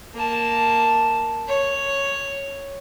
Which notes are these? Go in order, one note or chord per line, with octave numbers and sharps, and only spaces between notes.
A#3 A5
C#5